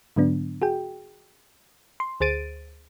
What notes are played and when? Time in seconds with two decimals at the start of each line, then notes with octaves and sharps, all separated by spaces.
0.16 G#2 D3 F#3 B3 D4
0.62 F#4 G#4 G5
2.00 C6
2.20 D2 G#4 C5 A6 D7 D#7